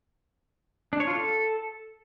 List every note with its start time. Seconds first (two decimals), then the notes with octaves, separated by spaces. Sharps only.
0.93 D4
1.00 C#5
1.07 F4
1.15 A4